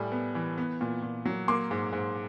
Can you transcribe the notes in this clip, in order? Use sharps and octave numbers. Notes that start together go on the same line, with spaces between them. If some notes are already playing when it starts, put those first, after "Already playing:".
Already playing: A2 G3 G#5
B3
E3
B3
A#2
A#2
F#3
A#3 C6 D6
G#2
G#2